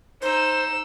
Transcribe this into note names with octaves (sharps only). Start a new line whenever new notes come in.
D#4 C5 E6